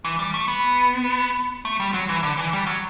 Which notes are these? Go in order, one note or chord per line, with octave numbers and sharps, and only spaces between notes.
E3
G3
A3
B3
A3
G3
F#3
E3
D3
E3
G3
F#3